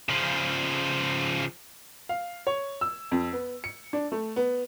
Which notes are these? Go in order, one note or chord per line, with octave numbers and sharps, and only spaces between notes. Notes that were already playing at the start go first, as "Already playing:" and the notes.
C#3 F3
F5
C#5
E6
F2
B3
C#7
D4
A3
B3